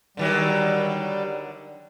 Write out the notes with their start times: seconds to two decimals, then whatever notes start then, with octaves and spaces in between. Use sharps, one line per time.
0.17 D3 D#3 F#3 G3